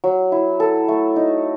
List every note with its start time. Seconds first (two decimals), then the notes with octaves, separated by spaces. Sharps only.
0.04 F#3
0.32 E4
0.60 A4
0.88 A3
1.16 D#4